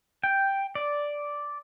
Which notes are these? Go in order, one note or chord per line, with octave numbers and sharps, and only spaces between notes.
G5
D5